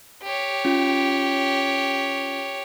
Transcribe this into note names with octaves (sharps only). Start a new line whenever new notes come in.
G4 C#5
C#4 F4